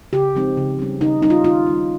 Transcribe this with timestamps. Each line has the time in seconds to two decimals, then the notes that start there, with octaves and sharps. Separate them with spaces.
0.13 C#3 G4
0.35 F3 G#3 C4 D#4
0.57 C#3
0.79 G3 C#4
1.01 C#3 D#4
1.22 G3 C#4 D#4
1.30 F4
1.44 D#3 F4
1.66 G3 C#4